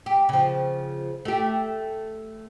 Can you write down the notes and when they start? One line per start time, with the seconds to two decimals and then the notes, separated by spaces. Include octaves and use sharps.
0.06 G4
0.29 C#3 F3
1.25 A3 G4